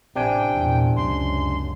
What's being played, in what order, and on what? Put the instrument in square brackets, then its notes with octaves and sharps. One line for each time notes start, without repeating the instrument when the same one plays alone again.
[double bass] A1 [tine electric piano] C3 D4 G#5 [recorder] G5
[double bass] E2 A#2
[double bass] C#2 F#2 [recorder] C6